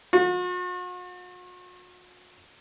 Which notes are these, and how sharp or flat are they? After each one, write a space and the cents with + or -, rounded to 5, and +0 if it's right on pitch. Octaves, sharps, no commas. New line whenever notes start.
F#4 -45